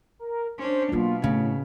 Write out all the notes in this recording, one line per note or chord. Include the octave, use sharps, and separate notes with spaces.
A#4
C#4 D4 C5
B2 F#3 A#3 F4
A2 C#3 A3